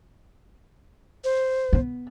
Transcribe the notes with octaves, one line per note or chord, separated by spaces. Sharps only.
C5
B3